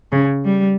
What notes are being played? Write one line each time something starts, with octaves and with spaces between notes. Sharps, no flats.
C#3
G3